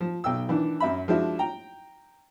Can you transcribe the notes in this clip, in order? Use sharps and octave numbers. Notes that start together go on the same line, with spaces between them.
F3
B1 G5 E6
D#3 E3 D4
F#2 E5 B5
F3 G#3 D4 E4 F#4
G5 A#5